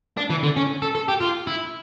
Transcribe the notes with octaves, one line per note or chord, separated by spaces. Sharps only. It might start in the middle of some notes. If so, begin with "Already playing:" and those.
D4
E3
D3
C#4
A4
A4
G4
F4
E4